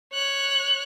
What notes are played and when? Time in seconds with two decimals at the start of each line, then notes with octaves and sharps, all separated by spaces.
0.13 C#5 F#6